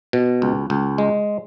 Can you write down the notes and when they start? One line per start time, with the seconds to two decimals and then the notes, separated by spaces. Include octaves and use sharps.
0.13 B2
0.42 C#2
0.70 C#2
0.98 G#3